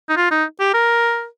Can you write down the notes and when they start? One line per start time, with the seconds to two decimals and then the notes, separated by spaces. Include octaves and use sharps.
0.09 D#4
0.17 F4
0.31 D#4
0.60 G4
0.74 A#4